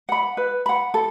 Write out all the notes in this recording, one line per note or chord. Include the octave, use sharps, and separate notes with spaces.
F#5 B5
B4
F#5 B5
A4